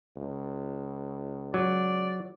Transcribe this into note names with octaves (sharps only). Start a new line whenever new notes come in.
C#2
F#3 D5